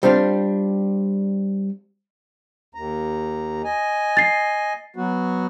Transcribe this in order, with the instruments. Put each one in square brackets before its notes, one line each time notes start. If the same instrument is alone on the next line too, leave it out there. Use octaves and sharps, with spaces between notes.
[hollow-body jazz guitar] G3 C4 D4 F4
[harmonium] D#2 A#5
D#5 G#5
[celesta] A6 C7
[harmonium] F#3 B3 F#4